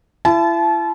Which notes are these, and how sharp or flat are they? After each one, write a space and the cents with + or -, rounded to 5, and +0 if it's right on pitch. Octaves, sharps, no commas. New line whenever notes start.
E4 +35 A5 -30